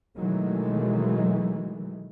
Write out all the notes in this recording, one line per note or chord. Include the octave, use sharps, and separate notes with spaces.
B2 D#3 E3 F#3 G#3 A3